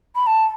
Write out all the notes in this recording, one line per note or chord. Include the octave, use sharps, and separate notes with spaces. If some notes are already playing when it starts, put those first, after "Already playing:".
B5
A5